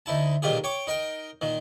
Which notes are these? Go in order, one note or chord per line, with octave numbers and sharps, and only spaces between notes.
D2 D#4 E4 A5
B1 A#2 D#3 F4 G4 G#4
C#5 G5 D6
D#4 A#4 G5
A#2 D#3